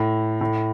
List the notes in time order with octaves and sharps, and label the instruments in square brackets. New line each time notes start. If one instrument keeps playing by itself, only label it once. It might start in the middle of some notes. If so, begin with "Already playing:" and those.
Already playing: [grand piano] A2
A2